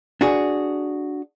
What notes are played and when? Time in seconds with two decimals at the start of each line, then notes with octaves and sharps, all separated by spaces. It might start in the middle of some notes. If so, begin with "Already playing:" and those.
0.21 D4 F#4 G#4